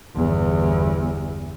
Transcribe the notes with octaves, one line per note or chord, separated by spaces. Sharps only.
G1 E2